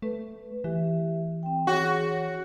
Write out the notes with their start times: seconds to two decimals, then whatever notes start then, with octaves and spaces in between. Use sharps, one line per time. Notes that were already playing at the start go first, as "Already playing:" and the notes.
0.02 A3 B4
0.64 E3 G4 E5
1.43 C4 G5
1.67 F#4 G#4 C#5 F#5
2.07 C#5